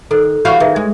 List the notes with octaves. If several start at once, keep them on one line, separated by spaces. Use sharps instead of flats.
D#3 A4 C5
E3 F#4 C#5 F5 C#6
D#3 G#4 B4 E5
G#3